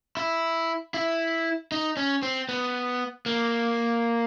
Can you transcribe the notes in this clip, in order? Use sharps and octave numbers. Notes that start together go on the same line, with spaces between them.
E4
E4
D#4
C#4
C4
B3
A#3